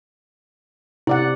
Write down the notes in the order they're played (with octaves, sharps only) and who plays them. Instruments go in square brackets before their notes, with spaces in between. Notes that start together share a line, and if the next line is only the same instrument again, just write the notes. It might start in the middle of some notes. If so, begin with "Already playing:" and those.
[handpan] C3 D5 F#5 [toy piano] E4